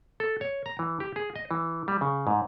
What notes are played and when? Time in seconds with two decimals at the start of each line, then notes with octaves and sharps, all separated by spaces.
0.20 A4
0.41 C#5
0.66 A#5
0.79 E3
1.00 G4
1.16 G#4
1.36 D#5
1.51 E3
1.88 G3
2.01 C#3
2.27 G#2